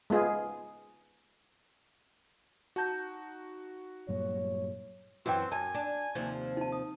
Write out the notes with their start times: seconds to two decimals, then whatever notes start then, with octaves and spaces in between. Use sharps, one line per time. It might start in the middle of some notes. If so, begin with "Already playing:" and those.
0.10 G#3 B3 F4 G#4
2.76 D#4 F#4 A5 G6
4.09 G2 A#2 F#3 C#5
5.26 F#2 E3 F#3 C4 F#4 G5
5.52 F#2 G#5 A5
5.74 D4
6.15 D#2 C3 F3
6.57 D#4 A5
6.72 D#6